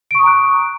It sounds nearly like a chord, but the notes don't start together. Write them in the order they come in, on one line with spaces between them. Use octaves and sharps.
D7 C#6 D#6 A#5 F#6